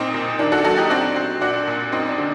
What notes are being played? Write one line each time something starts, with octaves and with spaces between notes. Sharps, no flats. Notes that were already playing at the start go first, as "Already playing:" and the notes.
Already playing: A#2 C4 D#4
A#2
D#3 D4
F#4 A4
F#3 F#4 A4
D#4 G4
C4 D4 F#4
C4
A#2 D4 F#4
A#2
F#2 C4 D#4
D4
D3